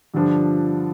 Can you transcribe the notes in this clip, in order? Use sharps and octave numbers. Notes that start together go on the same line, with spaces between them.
G2 D3 F3 D4 F4